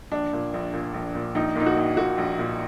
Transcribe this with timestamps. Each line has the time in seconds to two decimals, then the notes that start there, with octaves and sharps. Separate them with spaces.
0.12 A#1 D4
0.33 A#2
0.54 A#1
0.73 A#2
0.94 A#1
1.15 A#2
1.35 A#1 D#4
1.55 A#2 D#4
1.66 F#4
1.77 A#1
1.97 A#2 F#4
2.18 A#1
2.39 A#2